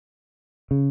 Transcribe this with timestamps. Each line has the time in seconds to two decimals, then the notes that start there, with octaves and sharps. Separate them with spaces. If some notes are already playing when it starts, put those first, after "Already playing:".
0.71 C#3